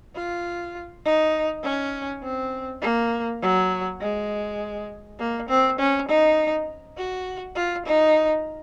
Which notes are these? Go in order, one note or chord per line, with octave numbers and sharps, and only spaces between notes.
F4
D#4
C#4
C4
A#3
F#3
G#3
A#3
C4
C#4
D#4
F#4
F4
D#4